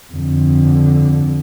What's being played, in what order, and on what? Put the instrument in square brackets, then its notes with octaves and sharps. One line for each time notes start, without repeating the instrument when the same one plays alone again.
[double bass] F2 D3